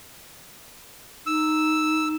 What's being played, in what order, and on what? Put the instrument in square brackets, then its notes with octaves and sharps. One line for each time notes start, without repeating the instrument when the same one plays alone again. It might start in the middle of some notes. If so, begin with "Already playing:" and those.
[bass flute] D#4 [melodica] E6